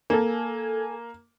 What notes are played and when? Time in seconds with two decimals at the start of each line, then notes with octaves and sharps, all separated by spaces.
0.10 A#3 A4 G#5